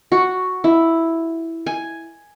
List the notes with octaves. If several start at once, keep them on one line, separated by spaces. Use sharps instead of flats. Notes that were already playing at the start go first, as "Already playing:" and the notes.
F#4
E4
G#5